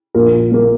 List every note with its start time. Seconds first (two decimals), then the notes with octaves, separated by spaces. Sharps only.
0.15 A#1 A#4
0.52 A#2 A#3